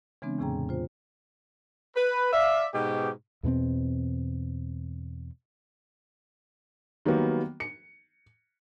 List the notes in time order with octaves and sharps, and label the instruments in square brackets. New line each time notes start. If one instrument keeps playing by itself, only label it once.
[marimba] C#3 E3 G#3 B3 C4 D4
E2 A2 C3 G#4 G5 A#5
F4 C5
[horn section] B4
D5 E5 F5
G#2 B2 G4
[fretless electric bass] E2 B2 B3 C4
[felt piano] D#3 F#3 G3 A#3 B3
C#7